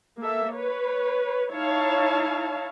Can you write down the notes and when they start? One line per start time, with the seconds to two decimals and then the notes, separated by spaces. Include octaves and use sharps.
0.19 A#3 A4 E5
0.53 B4 C#5
1.51 D#4 E4 C#5 F5 A5